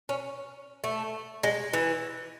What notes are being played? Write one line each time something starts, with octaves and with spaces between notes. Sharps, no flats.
C#4
A3
G#3
E3